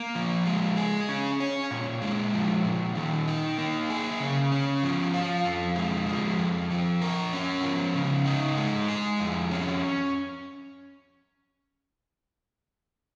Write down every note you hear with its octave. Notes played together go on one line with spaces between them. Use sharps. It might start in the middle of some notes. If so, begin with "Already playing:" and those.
Already playing: A#3
F3
G#3
G#4
C#4
C#5
A#2
G#3
F3
A#2
D#3
D#4
A#3
G#4
C#3
C#4
F3
F4
F2
G#3
F3
F2
F3
A#4
C#4
F3
C#3
D#4
G#3
G#4
F2
C#4